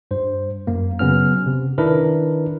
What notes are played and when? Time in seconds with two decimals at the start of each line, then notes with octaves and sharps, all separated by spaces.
0.11 G2 C5
0.67 F#2 A#3
0.99 C#3 F#3 B3 C#4 F6
1.46 C3
1.78 D#3 D4 E4 A#4 B4